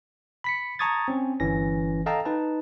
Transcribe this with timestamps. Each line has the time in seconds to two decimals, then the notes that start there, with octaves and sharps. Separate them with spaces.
0.44 B5 B6 C#7
0.79 A5 A#5 C#6 D#6 G#6 A6
1.08 C4 C#4
1.40 G1 E3 C#4 A#6
2.06 A4 D#5 F5 G5 A5 A#5
2.25 D#4 B4 A5